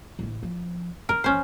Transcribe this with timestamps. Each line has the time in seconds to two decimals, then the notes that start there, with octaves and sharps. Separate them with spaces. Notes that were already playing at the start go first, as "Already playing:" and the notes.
0.19 A1 D3
0.43 F3
1.09 C#4 D#4 A#4
1.24 G1 F3 C#4 C5